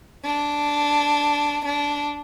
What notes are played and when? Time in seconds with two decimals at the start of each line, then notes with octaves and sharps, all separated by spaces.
0.25 D4
1.65 D4